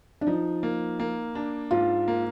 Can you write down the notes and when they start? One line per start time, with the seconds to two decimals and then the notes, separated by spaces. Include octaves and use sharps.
0.21 D4
0.27 F3 D#4
0.63 A#3
0.99 A#3
1.35 D4
1.71 G#2 F4
2.08 A#3